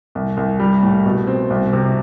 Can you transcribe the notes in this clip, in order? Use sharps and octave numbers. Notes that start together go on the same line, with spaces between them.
C2
C2
G3
A2
B2
C4
C2
C3